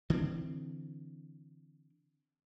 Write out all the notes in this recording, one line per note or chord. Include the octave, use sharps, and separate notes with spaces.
D3 E3 C4